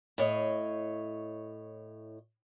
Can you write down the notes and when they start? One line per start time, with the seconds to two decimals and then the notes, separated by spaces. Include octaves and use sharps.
0.18 A2 C#5 D#5